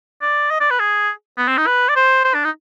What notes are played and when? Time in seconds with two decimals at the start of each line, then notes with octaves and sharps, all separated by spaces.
0.22 D5
0.51 D#5
0.60 D5
0.70 B4
0.80 G#4
1.38 B3
1.48 C4
1.58 D#4
1.67 B4
1.89 D5
1.96 C5
2.25 C5
2.34 D4
2.45 D#4